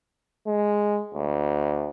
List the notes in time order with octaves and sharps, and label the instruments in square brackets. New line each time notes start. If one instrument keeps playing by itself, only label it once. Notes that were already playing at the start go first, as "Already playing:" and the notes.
[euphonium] G#3
D2